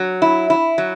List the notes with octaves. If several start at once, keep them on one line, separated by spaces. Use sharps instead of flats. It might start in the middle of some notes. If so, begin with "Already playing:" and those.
Already playing: F#3
E4
E4
F#3